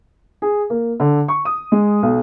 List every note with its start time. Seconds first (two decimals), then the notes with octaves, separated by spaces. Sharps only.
0.42 G#4
0.70 A#3
1.00 D3
1.28 C#6
1.45 D#6
1.72 G#3
2.03 B1